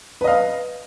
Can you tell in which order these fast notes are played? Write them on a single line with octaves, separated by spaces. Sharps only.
B4 D#5 F5